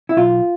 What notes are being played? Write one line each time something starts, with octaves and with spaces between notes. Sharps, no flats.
E4
B1 F4